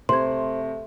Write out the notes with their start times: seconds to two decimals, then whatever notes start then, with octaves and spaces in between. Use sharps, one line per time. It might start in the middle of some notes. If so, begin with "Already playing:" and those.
0.09 C3 A3 C5 C6 G#6